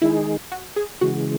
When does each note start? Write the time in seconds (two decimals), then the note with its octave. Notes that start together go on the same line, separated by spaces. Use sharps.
0.02 D#3 G#3 D#4 E4 G#4
0.52 F#4
0.76 G#4
1.01 C#3 E3 G#3 F#4